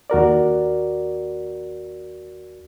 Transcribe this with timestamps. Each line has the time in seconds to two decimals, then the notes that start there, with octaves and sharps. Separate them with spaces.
0.10 D#2 F#4 A#4 D5